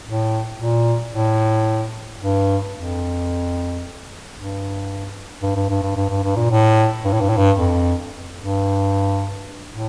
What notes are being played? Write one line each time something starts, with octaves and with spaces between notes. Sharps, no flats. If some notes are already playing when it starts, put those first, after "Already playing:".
A2
A#2
A2
G2
F2
G2
G2
G2
G2
G2
G2
G2
G2
A#2
A2
G2
A2
G2
A2
G2
F2
G2
A2